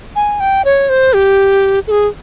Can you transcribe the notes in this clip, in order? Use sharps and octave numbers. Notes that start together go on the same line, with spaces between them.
G#5
G5
C#5
C5
G4
A4
G#4